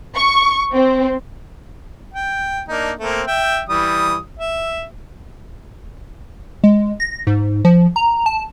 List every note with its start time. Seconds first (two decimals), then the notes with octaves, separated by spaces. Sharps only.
0.15 C#6
0.73 C4
2.14 G5
2.69 A#3 D4 D#4
3.00 A3 A#3 C4
3.27 E5 G5
3.69 E3 G3 D#6
4.39 E5
6.64 G#3
7.00 A#6
7.27 G#2
7.65 F3
7.96 A#5
8.26 A5